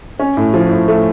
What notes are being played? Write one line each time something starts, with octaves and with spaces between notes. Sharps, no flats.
C#4
A2
F3
A2
A3